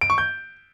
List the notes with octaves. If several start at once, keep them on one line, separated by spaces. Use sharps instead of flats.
D7
C#6
G6